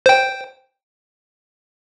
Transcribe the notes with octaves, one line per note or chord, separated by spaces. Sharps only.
C5 G5